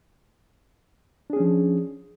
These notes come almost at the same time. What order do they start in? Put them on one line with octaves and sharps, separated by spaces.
D4 G#4 C#4 F3